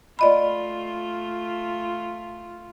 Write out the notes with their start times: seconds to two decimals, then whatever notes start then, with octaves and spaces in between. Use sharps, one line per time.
0.19 A3 F4 D5 D#5 B5